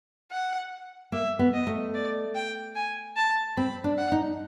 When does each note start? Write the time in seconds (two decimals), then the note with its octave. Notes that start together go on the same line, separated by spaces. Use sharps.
0.31 F#5
1.12 A#3 E5
1.39 B3
1.53 D#5
1.67 A3
1.94 D5
2.35 G5
2.75 G#5
3.16 A5
3.57 C4 B5
3.84 D4
3.98 F#5
4.12 D#4